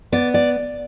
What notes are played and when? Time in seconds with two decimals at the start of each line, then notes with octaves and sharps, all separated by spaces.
0.12 B3 D5
0.34 D5